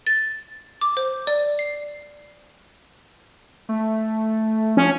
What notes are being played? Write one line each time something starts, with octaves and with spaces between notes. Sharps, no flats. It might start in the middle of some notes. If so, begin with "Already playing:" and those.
A6
D6
C5
D5
C7
A3
F3 C#4